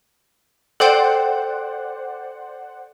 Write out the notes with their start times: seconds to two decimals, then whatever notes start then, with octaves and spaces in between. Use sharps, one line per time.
0.80 A4 C5 D5 F#5 G5